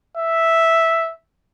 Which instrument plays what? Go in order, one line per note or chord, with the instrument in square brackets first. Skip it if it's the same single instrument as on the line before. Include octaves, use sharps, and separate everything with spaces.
[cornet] E5